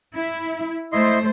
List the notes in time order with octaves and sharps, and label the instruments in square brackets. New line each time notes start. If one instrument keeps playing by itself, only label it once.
[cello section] E4
[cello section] A3 C5 [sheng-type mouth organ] E4 D#5 C6